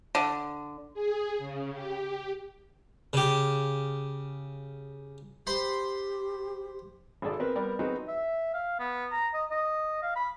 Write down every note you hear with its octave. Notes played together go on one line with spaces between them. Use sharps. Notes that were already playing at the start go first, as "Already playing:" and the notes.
D3
G#4
C#3
G4
C#3 G4
G4 C5 B5 C6
G#1 G#4 A4 D5
C4 A#4 B4
G3 B3 A#4 D5
F#3 B3 C4 D#4 F#4 G#4
E5
F5
B3
A#5
D#5
D#5
F5
B5